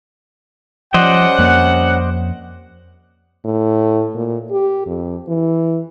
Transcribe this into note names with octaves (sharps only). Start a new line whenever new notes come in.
F3 G3 C#4 C5 D5 D#5 F#5
F2 A#3
A2
A#2
G4
F2
E3